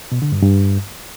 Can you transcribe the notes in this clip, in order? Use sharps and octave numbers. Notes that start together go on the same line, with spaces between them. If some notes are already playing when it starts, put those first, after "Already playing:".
B2
D3
G2
G2